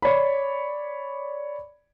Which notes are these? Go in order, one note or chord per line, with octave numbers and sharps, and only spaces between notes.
C#5 D5 B5